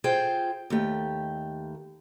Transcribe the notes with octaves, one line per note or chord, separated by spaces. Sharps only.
F4 G#4 C5 G5
D#2 A3 G4